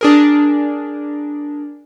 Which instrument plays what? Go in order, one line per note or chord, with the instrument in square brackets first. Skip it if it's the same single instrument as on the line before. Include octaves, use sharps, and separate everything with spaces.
[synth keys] D4 G#4 A#4